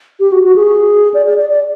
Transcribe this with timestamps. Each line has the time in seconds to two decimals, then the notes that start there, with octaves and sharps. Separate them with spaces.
0.20 G4
0.32 F#4
0.44 F#4
0.56 G#4
1.14 D5
1.26 D5
1.38 D5
1.49 D5